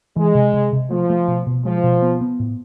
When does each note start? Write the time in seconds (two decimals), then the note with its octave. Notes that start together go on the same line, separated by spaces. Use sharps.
0.16 E3 G#3
0.35 C3
0.54 C3
0.73 C3
0.90 F3 A3
1.10 A3
1.28 B2
1.47 B2
1.65 F3 G#3
1.84 B2
2.02 B3
2.21 B3
2.40 A2